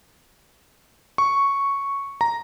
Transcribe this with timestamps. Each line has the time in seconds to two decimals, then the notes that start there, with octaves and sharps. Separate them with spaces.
1.18 C#6
2.21 A#5